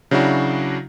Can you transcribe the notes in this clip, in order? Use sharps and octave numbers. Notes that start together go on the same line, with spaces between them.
C#3 F#3 D4 E4 F#4